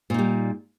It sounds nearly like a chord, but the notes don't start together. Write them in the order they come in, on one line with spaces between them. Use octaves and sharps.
A#2 D#4 G3